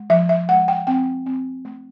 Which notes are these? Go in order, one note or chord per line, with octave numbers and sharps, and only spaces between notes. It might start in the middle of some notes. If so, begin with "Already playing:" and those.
Already playing: G#3
F3 E5
E5
G#3 F#5
G5
C4 G5
C4
A3